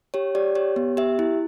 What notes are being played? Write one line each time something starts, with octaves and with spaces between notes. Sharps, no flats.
G4 C#5
G4 D5
G4 C#5
B3
G4 E5
E4